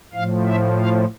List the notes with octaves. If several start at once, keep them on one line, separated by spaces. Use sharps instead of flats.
A2 F3 F5
E5
F5